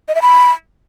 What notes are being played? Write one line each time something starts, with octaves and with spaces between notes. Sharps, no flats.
D#5
E5
B5